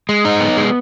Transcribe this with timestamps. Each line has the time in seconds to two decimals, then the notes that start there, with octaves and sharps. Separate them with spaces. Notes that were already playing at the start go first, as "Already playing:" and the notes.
0.09 G#3
0.25 D#4
0.40 B3
0.57 G#3